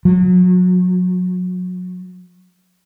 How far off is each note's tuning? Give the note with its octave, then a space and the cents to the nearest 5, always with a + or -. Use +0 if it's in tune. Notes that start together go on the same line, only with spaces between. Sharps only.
F#3 -30